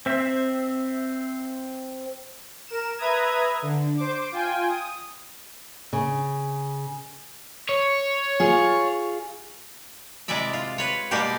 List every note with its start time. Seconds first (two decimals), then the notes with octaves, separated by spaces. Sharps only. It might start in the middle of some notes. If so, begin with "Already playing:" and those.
0.06 C4 E5
2.67 A#4 E7
2.99 B4 E5 A#5 D#6 G#6
3.62 D3
3.97 C5 D6
4.32 F4 G5 G#5
4.69 D#6
5.93 C#3
7.69 C#5
8.40 F4 G#4
10.28 C3 G#3 E4 D5 E5
10.53 F4
10.78 B4 C#5
11.11 B2 G3 G#3 A#3 G4 C5